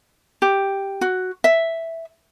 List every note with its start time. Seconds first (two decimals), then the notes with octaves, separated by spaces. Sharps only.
0.42 G4
1.01 F#4
1.44 E5